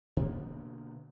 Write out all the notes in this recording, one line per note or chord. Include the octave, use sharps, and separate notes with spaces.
B2 D3 A#3 B3